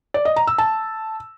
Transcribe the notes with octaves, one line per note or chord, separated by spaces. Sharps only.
D5
D#5
A#5
E6
A5